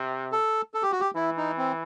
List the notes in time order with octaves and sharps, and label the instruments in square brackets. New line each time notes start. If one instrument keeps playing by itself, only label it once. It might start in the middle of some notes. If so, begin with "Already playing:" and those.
Already playing: [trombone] C3
[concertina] A4
A4
G4
F#4
G4
[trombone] E3 [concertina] E4
[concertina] D#4
C4